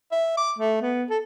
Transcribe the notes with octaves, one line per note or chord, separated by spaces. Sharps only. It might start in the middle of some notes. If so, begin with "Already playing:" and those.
E5
D6
A3
B3
A4